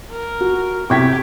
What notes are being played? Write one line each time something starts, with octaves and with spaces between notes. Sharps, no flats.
A#4
F#4
C3 E4 G4 G5 C#6 G#6 B6